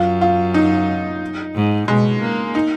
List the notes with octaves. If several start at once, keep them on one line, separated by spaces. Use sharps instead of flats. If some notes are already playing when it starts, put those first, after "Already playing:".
Already playing: F#2 F4
F4
D#4
G#2
B2 G#3
A#3
D#4